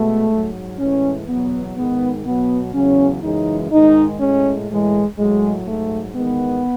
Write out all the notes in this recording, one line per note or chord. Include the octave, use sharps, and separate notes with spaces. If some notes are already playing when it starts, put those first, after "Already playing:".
Already playing: B2 G#3 A3
G#2 F#3
A2 E3 G#3 C#4
E2 B2 F#3 B3
G#2 D#3 G#3 B3
B2 F#3 B3
E2 C#3 F#3 C#4
F#2 C#3 E3 G#3 D#4
G#2 D#3 G#3 D#4
A2 G#3 C#4
A2 E3 G#3
A2 F#3 G#3
G#2 F#3 A3
E2 D#3 G#3 B3